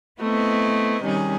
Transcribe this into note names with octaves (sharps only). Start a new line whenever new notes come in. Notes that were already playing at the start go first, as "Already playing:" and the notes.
A3 B3 C4 E4 D#5
C3 D#3 G3 C#4 G#4